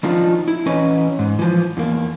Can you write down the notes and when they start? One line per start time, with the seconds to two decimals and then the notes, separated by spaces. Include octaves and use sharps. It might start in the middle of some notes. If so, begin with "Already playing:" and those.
0.03 D#3 F3 D4 D#4 F4
0.48 E4
0.66 E3 C#4 B4 D#5
1.19 G#2
1.39 E3 F3
1.77 E2 A#3